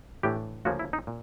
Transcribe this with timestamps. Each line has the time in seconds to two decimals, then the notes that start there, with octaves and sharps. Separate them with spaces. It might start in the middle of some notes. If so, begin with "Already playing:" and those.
0.23 A2 E3 A3 D4 G4
0.65 D2 C#3 F3 A#3 C#4 F#4
0.79 E4
0.93 D#4
1.07 A#2